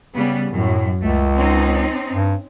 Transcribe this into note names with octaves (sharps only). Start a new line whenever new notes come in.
C#3 G3 B3
F#2 A2
C#2 A3
C4 C#4 D#4
G2